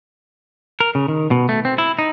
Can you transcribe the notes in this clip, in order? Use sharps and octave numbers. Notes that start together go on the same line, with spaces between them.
A#4
C#3
D#3
B2
A3
C4
E4
D#4